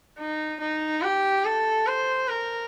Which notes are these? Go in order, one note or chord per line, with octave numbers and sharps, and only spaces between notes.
D#4
D#4
G4
A4
C5
A#4